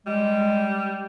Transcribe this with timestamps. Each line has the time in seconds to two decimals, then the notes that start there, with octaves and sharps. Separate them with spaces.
0.06 G3 G#3